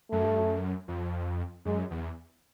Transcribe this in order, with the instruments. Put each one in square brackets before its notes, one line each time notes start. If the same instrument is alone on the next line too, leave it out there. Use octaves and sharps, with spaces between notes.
[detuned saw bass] F#2 [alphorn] A3
[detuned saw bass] G2
F#2
F2
[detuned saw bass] F#2 [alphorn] G#3
[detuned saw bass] E2